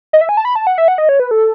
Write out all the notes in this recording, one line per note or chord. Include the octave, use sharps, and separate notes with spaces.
D#5
E5
G#5
A5
B5
A5
F#5
E5
F#5
D#5
C#5
B4
A4